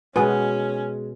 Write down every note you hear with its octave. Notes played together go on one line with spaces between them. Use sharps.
B2 G#3 C#4 B4 G#5 D#6